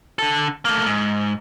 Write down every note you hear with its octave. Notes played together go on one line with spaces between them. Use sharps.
D3 A4
A3 A#3
G#2